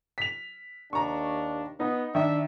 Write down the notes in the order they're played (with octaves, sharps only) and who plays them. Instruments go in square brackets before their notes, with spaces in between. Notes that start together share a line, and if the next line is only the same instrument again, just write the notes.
[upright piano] B6 F7
[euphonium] D#2 [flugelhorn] D4 [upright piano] A#5 C#6
[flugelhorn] B3 [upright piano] D#4
[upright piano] D#3 [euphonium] D4 [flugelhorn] E5